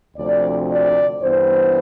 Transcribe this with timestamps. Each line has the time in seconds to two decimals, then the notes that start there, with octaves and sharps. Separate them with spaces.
0.17 D2 C3 F3 C4 D5
0.70 D5
1.22 G2 E3 B3 C5